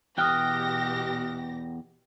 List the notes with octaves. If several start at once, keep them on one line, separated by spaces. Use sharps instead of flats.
E2 B2 G4 G5 D#6 F6 F#6 A#6